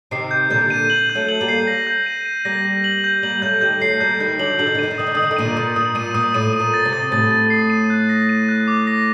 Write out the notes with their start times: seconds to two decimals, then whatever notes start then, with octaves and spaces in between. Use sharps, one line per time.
0.11 C3 D#3 C7
0.31 G6
0.50 A#2 D3 G6
0.70 D#7
0.90 F#7
1.10 G6
1.15 F#3 A3
1.28 F#7
1.41 G3 A#3
1.48 C7
1.67 A#6
1.87 G6
2.06 D#7
2.25 D#7
2.45 G3 A#3 A#6
2.65 A#6
2.84 F#7
3.04 G6
3.23 G3 A#3 F#7
3.42 F#3 A3 G6
3.61 D#3 G3 G6
3.81 F#3 A3 C7
4.00 G3 A#3 G6
4.20 D#3 G3 G6
4.39 D3 F#3 F#7
4.59 D3 F#7
4.67 D#3
4.75 D3
4.79 D#3 D#7
4.91 D3
4.98 D#3 D#6
5.07 D3
5.15 D#3 D#6
5.22 D3
5.31 D#3
5.37 A#2 D3 D#7
5.57 A#2 D#6
5.76 A#2 D#6
5.95 A#2 D#7
6.14 A#2 D#6
6.34 A2 D#7
6.53 D#7
6.60 A#2
6.74 A6
6.85 C3
6.93 A6
7.12 A2 A6
7.31 A6
7.50 C7
7.70 D#7
7.90 F#6
8.09 A#6
8.29 D#7
8.48 F#6
8.68 D6
8.87 A#6